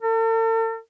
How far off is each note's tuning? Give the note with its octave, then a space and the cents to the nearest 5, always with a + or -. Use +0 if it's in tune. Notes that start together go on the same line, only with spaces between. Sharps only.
A4 +45